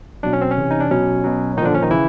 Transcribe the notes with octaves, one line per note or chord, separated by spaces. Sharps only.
B2 F#3 D4
C#4
C4
C#4
C3 E3
D#4
D4
B2 F#3 C#4
B2 F#3
A#2 D3 D#3 F3 D4 D#4
C#4
D#3 D#4
C#3 E3 E4